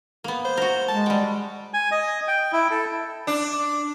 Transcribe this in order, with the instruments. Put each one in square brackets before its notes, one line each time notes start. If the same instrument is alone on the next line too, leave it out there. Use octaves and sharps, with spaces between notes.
[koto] A#3 B3
[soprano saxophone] C5
[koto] F#4 A#4
[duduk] G#3 [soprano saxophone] A5
[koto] G3 G5 [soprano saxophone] F#4
[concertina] G#5
D#5
G5
E4
A4
[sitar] D4